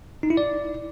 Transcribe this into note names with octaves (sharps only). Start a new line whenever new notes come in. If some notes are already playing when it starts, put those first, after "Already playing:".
D#4
E4
D5